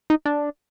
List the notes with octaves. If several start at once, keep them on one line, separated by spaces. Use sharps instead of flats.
D#4
D4